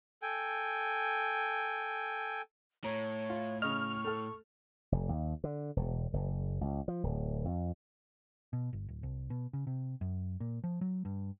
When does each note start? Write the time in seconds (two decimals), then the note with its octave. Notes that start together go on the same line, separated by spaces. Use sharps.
0.22 A4 G5 G#5
2.84 A2 C#5 A#5
3.30 F4
3.62 C#3 D#5 C#6 F6
4.04 A3 A4
4.92 F1
5.09 D#2
5.44 D3
5.77 E1
6.13 F#1
6.61 C#2
6.88 F3
7.03 D1
7.45 F2
8.53 B2
8.73 G1
8.89 D1
9.03 C2
9.30 B2
9.53 C#3
9.67 C3
10.01 F#2
10.40 A#2
10.64 F3
10.81 F#3
11.05 G2